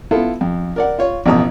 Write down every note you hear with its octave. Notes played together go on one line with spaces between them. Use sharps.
B3 E4 F4 A4
F2
A#4 D5 F#5
F4 C#5
A1 F2 B2 A#5 D#6